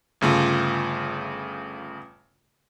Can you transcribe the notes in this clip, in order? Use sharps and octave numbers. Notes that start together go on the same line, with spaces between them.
G1 C#3 A3 F4